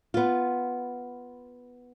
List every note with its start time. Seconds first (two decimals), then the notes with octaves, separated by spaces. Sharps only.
0.14 B3 F4